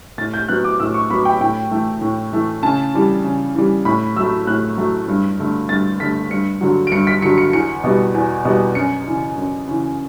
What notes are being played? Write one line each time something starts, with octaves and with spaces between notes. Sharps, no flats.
A2 A6
G6
F#3 B3 F#6
D6
A2 E6
C#6
F#3 B3 B5
G5
A2 G5
E3 A3
A2
E3 A3
C#3 A5
E3 G3
C#3
E3 G3
A2 B5
F#3 A3 E6
A2 F#6
F#3 A3
G2
D3 A3
G2 A6
D3 A3 B6
G2 C#7
D3 F#3
D7
G2 C#7
B6
D3 F#3 C#7
C#7
E2 C#7
B2 G3 B3
E2
B2 G3 B3
F#2 C#7
C#3 E3
F#2
C#3 E3